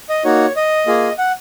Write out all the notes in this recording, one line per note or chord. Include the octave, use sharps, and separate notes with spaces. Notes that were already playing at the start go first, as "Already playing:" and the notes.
D#5
A#3 D#4 F#4 C#5
D#5
A#3 F4 G#4
F#5